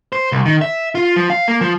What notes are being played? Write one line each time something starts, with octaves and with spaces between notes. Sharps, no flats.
C5
C2
D#3
E5
F4
F3
F5
A#3
F3